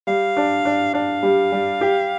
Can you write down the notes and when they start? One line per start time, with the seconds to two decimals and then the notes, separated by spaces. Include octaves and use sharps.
0.07 G3 F5
0.37 D4
0.65 D4
0.93 D4 F5
1.23 G3
1.52 G3
1.81 G4